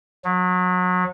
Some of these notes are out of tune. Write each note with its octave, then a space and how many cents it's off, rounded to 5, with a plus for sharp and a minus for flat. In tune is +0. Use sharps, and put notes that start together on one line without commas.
F#3 -30